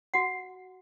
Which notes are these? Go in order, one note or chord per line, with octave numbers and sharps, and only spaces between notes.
F#4 F#5